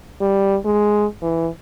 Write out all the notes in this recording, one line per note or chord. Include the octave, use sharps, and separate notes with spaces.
G3
G#3
E3